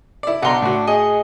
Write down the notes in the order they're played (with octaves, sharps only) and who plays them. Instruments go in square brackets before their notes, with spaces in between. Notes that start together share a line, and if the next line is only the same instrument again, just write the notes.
[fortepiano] E4 D5
[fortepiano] B1 A#5 [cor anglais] D4 [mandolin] F#5 C6
[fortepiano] A2 F#4
[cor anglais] G#4 [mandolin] D#5